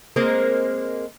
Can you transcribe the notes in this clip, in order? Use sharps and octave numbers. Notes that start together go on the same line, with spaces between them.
G#3 A#3 C4